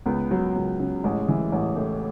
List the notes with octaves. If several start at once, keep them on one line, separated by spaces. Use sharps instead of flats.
C#2 B3
F#3
C#2
C#3
A1 G#3
E3
A1
A2